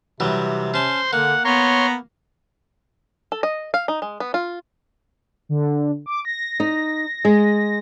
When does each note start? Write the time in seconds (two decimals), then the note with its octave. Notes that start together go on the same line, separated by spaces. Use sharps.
0.20 C3 E3 F#3 G3
0.74 C#4 C5 A5
1.13 D3 A#3 F#5
1.45 B3 C#5 A#5 C6
3.32 A4
3.43 D#5
3.74 F5
3.88 D#4
4.02 G#3
4.20 B3
4.34 F4
5.49 D3
6.06 D6
6.25 A#6
6.60 D#4
7.25 G#3